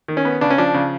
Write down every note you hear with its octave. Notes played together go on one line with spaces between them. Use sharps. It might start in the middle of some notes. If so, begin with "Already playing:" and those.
D#3
C#4
B3
C#3 D4
C#4
F3 D4
C#3